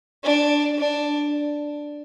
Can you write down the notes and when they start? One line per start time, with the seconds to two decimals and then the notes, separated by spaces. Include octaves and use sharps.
0.24 D4
0.78 D4